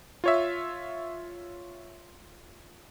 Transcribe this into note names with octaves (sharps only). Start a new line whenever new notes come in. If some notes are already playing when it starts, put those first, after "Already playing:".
F4 C#5 E5